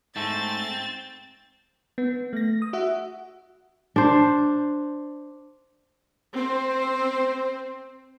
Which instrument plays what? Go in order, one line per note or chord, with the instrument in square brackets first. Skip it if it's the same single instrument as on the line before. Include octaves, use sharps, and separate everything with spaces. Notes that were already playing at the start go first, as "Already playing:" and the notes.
[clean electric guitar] G#2 A3 [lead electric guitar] C4 C5 [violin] A6
[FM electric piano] B3
A3 A#6
D#6
F#4 E5 F#5
[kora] D4 C5
[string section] C4 C5